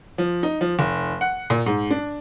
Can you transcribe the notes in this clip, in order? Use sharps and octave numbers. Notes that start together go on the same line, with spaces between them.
F3
D#4
F3
F1
F#5
A#2
G#2
D4